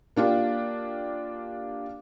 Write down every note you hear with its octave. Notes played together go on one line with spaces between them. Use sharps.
A#3 D4 F4 G4